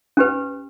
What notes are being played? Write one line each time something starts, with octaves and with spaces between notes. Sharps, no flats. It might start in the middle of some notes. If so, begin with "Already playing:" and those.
C#4 G4 B4